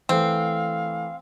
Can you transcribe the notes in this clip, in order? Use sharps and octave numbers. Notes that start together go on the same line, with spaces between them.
E3 A3 C4 F5